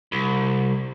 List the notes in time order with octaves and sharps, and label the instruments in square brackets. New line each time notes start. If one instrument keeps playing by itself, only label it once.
[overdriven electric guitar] C2